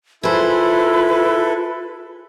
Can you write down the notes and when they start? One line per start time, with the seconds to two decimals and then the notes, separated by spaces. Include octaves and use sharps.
0.23 E4 F4 G#4 A4 B4 C5